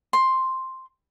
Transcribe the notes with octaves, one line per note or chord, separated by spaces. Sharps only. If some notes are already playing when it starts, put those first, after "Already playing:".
C6